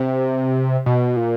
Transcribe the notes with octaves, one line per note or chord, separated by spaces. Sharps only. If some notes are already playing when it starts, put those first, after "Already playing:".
Already playing: C3
B2
A#2